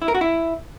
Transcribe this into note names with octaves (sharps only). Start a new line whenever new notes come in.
E4
A#4
F#4
E4